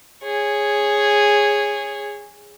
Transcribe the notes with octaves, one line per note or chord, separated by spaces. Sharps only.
G#4 C#5